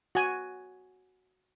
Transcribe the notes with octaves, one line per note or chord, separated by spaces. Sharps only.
F#4 G#5